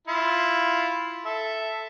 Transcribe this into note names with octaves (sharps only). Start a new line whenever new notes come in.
E4 F4 B5
A4 E5